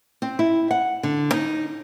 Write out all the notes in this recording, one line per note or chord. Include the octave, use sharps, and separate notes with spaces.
C4
E4
F#5
D3
D#4